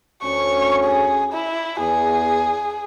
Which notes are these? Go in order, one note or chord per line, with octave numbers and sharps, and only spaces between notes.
D2 C#4 C#6
G#4
E4
E2 G#4